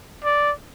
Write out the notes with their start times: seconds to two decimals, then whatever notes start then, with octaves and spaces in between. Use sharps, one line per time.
0.25 D5